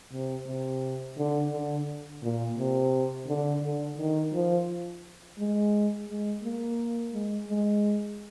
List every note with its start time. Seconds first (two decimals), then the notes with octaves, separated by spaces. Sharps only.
0.12 C3
0.47 C3
1.17 D3
1.52 D3
2.23 A#2
2.57 C3
3.27 D3
3.63 D3
3.97 D#3
4.33 F3
5.38 G#3
6.08 G#3
6.42 A#3
7.13 G#3
7.48 G#3